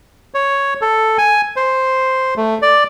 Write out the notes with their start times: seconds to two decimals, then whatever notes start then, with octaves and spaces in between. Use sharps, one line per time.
0.34 C#5
0.82 A4
1.18 G#5
1.56 C5
2.37 A3
2.62 D5